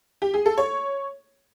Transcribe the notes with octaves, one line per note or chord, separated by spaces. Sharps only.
G4
G#4
A4
C#5